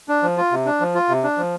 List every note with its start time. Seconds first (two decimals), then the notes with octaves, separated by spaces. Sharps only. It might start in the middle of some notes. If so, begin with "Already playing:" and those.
0.09 D4
0.22 F3
0.37 F4
0.51 C3
0.66 D4
0.80 F3
0.95 F4
1.09 C3
1.24 D4
1.38 F3